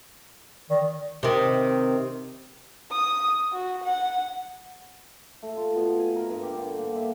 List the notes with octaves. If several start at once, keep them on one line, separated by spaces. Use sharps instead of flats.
D#3 D5
C3 D#3
D#6
F#4
F#5
A3
F4
B2
G#5
A#4
G2
G4
D3
A#3
E5